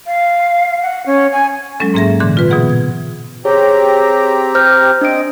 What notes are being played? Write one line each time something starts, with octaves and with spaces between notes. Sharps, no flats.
F5
F#5
C#4
G#5
F#3 G#3 C#4 A4
G#2 A#3 C#4 G#4 E5 A#6
A#2 D3 E3 C6
F4 B4
B2 E3 B3 G#4 F#5
G#6
C4 G4 G#4 C#5 A#5
C5 F6 G6
C4 D4 D#5 D7